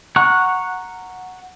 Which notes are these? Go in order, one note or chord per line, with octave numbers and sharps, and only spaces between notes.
F#5 A#5 C#6 F6 F#6